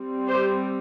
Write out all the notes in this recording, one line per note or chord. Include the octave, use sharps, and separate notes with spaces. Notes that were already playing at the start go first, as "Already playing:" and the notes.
Already playing: G3 C4
G4 C5